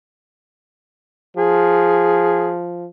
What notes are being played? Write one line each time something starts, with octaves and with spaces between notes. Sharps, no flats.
F3 G#4